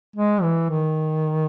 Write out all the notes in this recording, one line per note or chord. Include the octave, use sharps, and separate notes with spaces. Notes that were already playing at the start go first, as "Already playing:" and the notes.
G#3
E3
D#3